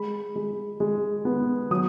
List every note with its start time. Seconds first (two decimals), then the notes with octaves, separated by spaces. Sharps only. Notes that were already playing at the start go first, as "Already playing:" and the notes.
Already playing: G#3 B5
0.36 G#3
0.80 G#3
1.25 B3
1.71 F#3 D#6